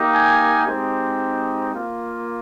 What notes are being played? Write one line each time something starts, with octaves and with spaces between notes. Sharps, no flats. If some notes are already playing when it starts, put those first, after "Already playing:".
Already playing: A#3 D#4 G4
G#5
G#3 C4 D#4 G4
A#3 F4